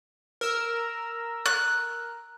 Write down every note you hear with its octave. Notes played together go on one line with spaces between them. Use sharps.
A#4 E6
F#6